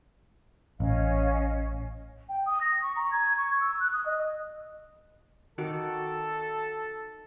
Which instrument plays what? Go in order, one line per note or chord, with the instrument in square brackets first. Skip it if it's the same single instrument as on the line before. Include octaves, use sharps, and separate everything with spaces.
[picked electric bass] A1 [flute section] C#4 D#5 F5
[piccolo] G5
D#6
A#6
C#6
A#5
G#6
C#6
E6
F#6
D#6
D#5
[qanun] D#3 F#4 D6 [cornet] A4